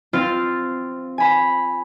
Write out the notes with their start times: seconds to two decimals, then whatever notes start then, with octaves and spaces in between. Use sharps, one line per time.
0.13 C4 F4 C6 F6 A6 C7
1.18 G#5 B5